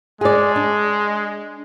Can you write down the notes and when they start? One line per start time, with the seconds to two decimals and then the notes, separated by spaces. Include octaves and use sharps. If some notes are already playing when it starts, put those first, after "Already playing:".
0.21 G#3 G#4 D5
0.56 D4